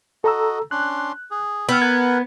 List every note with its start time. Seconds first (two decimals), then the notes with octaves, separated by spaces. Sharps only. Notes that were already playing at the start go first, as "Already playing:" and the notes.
0.24 F#4 A4 D#5 A#5 E6
0.71 C#4 D4 C6 F#6
1.31 G#4
1.69 B3 G5 B5 E6 F6
1.82 A#4 B4 F#5 G#6